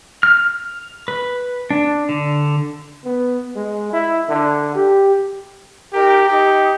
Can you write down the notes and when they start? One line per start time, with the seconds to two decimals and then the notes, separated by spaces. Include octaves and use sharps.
0.23 F6
1.08 B4
1.70 D4
2.09 D3
3.05 B3
3.56 G#3
3.93 E4
4.29 D3
4.75 G4
5.93 D#4 G4 A#4
6.29 D#4 G4